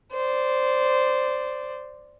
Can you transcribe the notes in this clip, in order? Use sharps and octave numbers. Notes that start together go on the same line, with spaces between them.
C5 D5